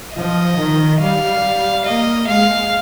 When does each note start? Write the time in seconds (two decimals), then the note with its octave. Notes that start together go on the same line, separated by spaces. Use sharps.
0.16 F3 D#5
0.57 D#3
1.00 G3 F5
1.85 A#3 D#5
2.28 G#3 F5